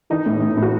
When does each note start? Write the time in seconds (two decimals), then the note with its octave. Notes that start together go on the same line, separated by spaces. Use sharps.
0.10 E3 D#4
0.26 A2
0.42 A2
0.57 A2
0.62 F#4